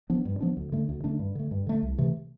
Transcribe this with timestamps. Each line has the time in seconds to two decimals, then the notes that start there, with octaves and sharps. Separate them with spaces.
0.10 F3 B3 D4
0.25 G2
0.41 F3 B3 D4
0.57 D2
0.72 D3 A3 D4
0.89 D2
1.04 D3 A3 D4
1.19 G2
1.35 D3 A3
1.51 G2
1.67 D3 A3
1.82 C2
1.98 C3 E3 A3